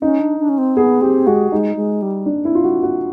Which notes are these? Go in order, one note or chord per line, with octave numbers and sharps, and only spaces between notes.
C#4 D#4
D4
D4
C#4
C4
B3 G#4
C4 G4
G#3 F#4
G#3 D#4
G#3
G3
D4
E4
F4
F#4
F#4